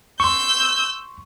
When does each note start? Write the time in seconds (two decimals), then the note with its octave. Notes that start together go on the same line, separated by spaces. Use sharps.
0.20 C6 C#6 E6 G6